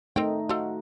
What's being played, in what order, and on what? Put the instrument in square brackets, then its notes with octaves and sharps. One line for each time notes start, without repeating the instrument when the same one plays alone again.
[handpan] A3 D#4 [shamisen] C4 A#4 G5
[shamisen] F3 A4 [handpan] F#4